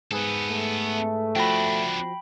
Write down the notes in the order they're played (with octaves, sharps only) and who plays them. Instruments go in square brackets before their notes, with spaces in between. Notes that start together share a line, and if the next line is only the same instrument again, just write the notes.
[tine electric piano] G#2 G#4 B4 [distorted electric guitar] B3 A4
[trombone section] A3
[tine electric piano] F3 F#4 A#6 [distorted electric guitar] B3 D4 [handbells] G5 B5